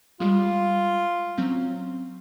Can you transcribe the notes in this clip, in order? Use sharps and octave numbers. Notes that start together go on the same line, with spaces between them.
G3 G#3 F4
F#3 C4 C#4